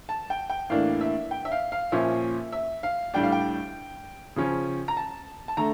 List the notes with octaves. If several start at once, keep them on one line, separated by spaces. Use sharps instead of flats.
A5
G5
G5
A2 E3 A#3 D4 F5
E5
G5
E5
F5
F5
A#2 F3 C#4 E5
E5
F5
A2 G3 D4 G5
F5
G5
C#3 F3 C#4
A#5
A5
A5
D3 A3 A#5